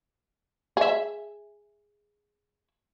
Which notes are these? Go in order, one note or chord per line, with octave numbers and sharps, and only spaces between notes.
G#4 E5